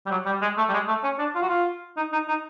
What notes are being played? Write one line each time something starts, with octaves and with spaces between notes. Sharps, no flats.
G3
F#3
G3
G#3
A3
G3
G#3
A3
C#4
D4
F4
F#4
F4
D#4
D#4
D#4